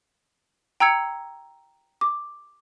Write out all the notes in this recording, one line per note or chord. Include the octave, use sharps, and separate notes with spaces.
G5 A#5 E6 G#6 C#7
D6